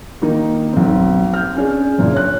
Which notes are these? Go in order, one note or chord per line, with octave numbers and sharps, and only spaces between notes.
D#3 A#3 D#4
B1 C4
F6 G6
C#4 D4 G#4
F#1 A#2
C#5 F#6